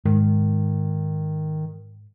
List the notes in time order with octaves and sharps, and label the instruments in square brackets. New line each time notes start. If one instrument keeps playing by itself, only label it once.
[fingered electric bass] G#2 [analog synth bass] D#3